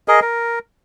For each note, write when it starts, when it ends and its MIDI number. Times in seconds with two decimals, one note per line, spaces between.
0.08 0.20 68
0.08 0.20 70
0.08 0.20 75
0.22 0.59 70